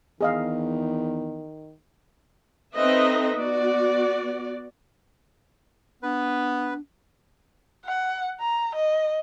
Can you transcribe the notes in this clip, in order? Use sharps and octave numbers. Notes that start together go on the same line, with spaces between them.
E2 D#3 G#4 D#5 F5
C4 D#4 A4 B4 D#5 E5
B3 F#4 D5
B3 D4 B4
F#5
A#5
D#5